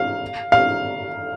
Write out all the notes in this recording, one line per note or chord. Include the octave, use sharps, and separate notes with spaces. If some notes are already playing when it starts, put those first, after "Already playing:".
Already playing: F5
F5